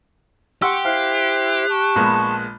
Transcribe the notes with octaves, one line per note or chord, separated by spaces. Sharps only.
G4 F#5 C6 C#6 E6
E4 C5 F5 F#6
A5 C#6
A#1 G#3 B3